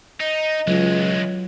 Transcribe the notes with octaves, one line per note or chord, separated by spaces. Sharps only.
D#4 D#5
C#2 E3 F#3 G#3 F4